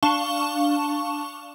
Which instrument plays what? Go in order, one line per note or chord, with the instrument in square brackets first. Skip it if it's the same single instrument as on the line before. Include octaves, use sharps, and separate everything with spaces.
[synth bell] D4 F5 A5 C#6 E7 G7